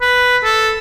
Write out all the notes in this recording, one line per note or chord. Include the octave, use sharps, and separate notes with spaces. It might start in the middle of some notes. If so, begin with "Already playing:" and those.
B4
A4